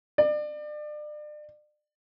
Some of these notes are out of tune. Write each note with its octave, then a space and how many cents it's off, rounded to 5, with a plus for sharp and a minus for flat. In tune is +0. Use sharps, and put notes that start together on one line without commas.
D5 +35